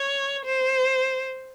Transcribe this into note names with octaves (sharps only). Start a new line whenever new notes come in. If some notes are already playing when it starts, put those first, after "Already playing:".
Already playing: C#5
C5